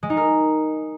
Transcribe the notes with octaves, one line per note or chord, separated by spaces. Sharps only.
G#3
D#4
A#4